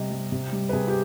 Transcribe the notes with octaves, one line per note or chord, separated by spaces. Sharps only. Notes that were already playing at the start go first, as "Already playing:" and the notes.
Already playing: C3 G3 D#5
G3
C3
G3
B4
C3 G#4
G4